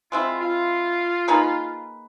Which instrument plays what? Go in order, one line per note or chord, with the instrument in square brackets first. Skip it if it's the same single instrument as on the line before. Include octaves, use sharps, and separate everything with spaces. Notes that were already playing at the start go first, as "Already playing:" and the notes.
[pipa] G#3 C4 E4 [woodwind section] F4
[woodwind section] F4
[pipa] A#3 D#4 G#4 B4